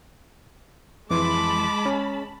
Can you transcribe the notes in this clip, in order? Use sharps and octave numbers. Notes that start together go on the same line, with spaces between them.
F2 E3 G#3 A5 B5 C6 D6
C#4